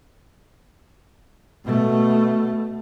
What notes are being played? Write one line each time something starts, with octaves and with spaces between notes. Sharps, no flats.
B2 A3